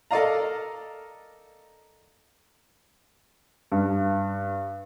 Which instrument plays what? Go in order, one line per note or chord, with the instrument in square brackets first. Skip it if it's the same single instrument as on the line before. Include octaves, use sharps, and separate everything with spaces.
[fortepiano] A4 A#4 D5 D#5 F5 A#5
[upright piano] G2